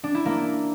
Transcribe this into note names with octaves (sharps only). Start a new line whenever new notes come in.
D4
E4
A#3